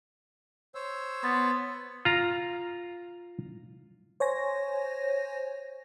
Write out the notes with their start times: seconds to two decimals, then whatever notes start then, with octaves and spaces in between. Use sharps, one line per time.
0.75 C5 C#5 E6
1.23 B3 C6 A6
2.05 F4 A#5
4.20 C5 C#5 G#5 A#6